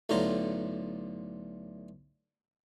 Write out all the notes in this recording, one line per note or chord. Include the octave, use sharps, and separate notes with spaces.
B1 A2 D3 F4 A#5